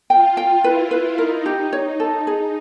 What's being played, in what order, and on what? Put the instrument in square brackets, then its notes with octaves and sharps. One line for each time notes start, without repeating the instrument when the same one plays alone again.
[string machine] F4 [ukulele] G5
[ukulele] G5
[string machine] E4 [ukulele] B4
[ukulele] B4
[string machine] D#4 [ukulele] A#4
[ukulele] G4
[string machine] D#4 [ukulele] C#5
[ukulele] A4
G#4